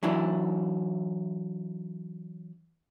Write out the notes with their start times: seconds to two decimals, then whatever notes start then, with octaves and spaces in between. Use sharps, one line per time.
0.03 E3 F#3 D4 E4